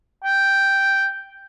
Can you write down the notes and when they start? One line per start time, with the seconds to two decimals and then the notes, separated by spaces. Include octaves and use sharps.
0.24 G5